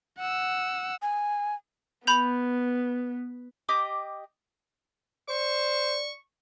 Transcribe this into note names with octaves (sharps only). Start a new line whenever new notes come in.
F#5 E6
G#5
B3 B5 G6 F7
G4 D#5 D6 D#6
C5 D5 C#6